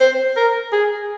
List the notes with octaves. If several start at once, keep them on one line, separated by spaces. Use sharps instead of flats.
C5
A#4
G#4